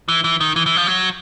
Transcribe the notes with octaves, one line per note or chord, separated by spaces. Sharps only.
E3
E3
D#3
E3
E3
F3
F#3